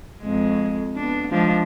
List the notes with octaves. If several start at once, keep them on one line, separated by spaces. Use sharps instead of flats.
F2 G#3
B3 D4
F3 G#3 D4